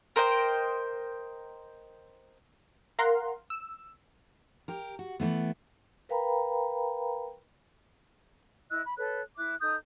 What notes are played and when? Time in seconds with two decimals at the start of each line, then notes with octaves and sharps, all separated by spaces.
0.16 A#4 C5 D#5 G5
2.99 A#4 F5 F#5 A#5 C6
3.50 E6
4.68 G4 A#4
4.99 F#4
5.20 E3 A3 B3
6.09 A#4 B4 F5 G5 A#5 B5
8.71 E4 D#5 E6 F#6
8.85 B5
8.97 A4 B4 C#5 F#6
9.36 E4 E5 D6 F#6
9.60 D#4 A4 D#6 G6